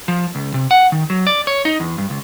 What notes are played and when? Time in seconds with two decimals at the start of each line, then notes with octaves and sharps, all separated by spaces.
0.08 F3
0.35 C#2
0.54 C3
0.71 F#5
0.92 D#3
1.10 F#3
1.27 D5
1.47 C#5
1.65 D#4
1.80 E2
1.98 G2
2.10 C#2